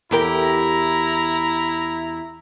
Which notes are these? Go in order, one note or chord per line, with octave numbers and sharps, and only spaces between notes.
E2 E4 G4 A#4 A#5